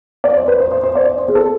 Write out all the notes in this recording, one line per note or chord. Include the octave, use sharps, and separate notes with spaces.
D5
C5
B4
C5
C5
C5
D5
C5
C5
G#4
A4